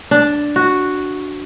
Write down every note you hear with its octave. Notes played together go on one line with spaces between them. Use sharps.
D4
F#4